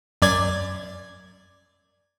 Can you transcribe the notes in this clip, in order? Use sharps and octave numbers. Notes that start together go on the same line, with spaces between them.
F#2 D5 G#6